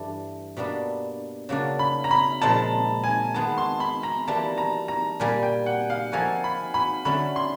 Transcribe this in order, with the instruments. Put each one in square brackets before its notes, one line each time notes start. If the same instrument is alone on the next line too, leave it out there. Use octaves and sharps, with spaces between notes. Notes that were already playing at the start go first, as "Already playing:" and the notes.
Already playing: [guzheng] G2 E3 A3 D4
B2 G3 A#3 D4
C#3 F#3 A#3 D4
[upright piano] B5
A#5
B5
[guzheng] A#2 F3 G#3 [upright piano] A5
[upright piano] G#5
[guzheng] D#3 G#3 B3 D#4 [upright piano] A5
[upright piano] C6
B5
A#5
[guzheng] E3 G3 A#3 [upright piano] A5
[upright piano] A#5
A#5
[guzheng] A#2 G3 A#3 [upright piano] G#5
[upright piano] G5
F#5
F5
[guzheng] F3 A#3 D#4 F#4 A4 [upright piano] G#5
[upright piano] B5
B5
[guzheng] D3 F#3 A3 C#4 [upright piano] B5
[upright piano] C6